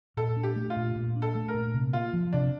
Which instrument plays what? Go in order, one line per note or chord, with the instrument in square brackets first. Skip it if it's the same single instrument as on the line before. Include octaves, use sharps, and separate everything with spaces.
[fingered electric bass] A#2 [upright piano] A4
[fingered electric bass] D4
[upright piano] G4
[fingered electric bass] A3
[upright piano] F4
[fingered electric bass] A#2
A#2
D4
[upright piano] A4
[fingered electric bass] A3
[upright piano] A#4
[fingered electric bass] A#2
C3
[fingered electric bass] A#3 [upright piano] F4
[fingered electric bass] F3
[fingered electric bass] C3 [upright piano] D4